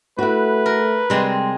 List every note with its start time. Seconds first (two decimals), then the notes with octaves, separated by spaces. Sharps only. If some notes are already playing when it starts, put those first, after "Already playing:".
0.19 A3 E4 F#4 B4
0.66 A#4
1.10 C3 G3 G#3 C4